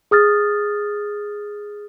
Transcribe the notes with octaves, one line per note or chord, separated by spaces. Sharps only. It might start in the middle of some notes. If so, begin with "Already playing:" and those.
G#4 D#6 F6 A6